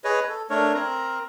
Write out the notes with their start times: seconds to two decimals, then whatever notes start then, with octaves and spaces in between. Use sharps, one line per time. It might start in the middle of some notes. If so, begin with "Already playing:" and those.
0.04 G#4 B4 C#5 D#5
0.29 A4
0.50 A3 D4 A#4 C#5
0.74 C4 A#4 A#5